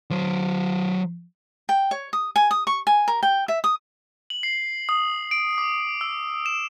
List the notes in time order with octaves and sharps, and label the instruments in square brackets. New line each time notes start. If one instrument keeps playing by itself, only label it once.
[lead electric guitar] F#3 C5
[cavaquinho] G5
C#5
D#6
G#5
D#6
C#6
G#5
A#4
G5
E5
D#6
[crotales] F#7
C7
D#6
D7
D6
E6
E7